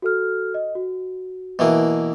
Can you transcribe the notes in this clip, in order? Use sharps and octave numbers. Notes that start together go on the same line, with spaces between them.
F#4 A4 F6
D#5
F#4
B2 E3 A#3